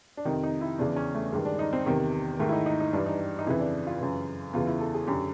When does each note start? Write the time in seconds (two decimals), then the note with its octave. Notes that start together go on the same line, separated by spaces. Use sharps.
0.17 D4
0.25 F2 C3 D#3 D#4
0.43 D#4
0.61 E4
0.78 E2 C#3 E3 D4
0.96 C#4
1.14 A3
1.32 G2 D#3 G#3
1.45 D4
1.59 D#4
1.73 C4
1.86 E2 C3 D#3
2.39 G#2 D#3 A3
2.49 E4
2.53 D#4
2.66 D#4
2.80 D#4
2.93 G2 E3 D4
3.06 D#4
3.39 D#4
3.47 F2 C#3 E3 E4
3.60 D4
3.87 F4
4.01 F#2 C#3 E3
4.53 E2 C#3 E3 F4
4.67 E4
4.80 A4
4.94 G#4
5.07 F#2 D3 G4